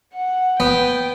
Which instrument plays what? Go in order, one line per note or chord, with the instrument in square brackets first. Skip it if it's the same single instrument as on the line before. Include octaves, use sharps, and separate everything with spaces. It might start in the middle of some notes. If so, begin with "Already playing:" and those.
[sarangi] F#5
[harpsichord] B3 [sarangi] G5